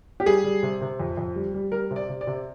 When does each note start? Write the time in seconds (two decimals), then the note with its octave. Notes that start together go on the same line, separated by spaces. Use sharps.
0.20 G4
0.26 G3 G#4
0.44 G3
0.63 C3
0.81 C3
1.00 F2
1.17 F2
1.36 G3
1.54 G3
1.72 G3 A#4
1.91 C3
1.96 D5
2.09 C3
2.21 D5
2.27 C3